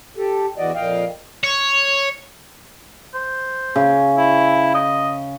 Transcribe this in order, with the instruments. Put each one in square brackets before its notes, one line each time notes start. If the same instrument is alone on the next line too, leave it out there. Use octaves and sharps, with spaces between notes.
[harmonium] G4 A4
E2 E3 F#4 D5 D#5
F2 A#2 D#5 F5 G5
[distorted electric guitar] C#5
[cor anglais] C5
[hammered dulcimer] C#3
[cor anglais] E4
D#5